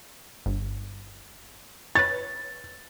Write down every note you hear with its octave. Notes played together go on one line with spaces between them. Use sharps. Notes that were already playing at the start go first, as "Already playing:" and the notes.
G1
B4 C#5 A6